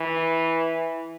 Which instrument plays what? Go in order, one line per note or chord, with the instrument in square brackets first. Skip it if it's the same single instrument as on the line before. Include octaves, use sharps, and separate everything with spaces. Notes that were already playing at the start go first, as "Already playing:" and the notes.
Already playing: [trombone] E3